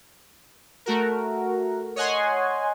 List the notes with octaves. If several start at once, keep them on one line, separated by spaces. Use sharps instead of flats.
A3 F#4 A#4
C#5 D#5 F#5 G#5 C6